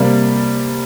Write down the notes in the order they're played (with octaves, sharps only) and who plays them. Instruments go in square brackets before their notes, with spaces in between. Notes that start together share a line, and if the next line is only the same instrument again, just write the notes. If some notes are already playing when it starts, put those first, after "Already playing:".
Already playing: [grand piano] C3 G3 A#3 D5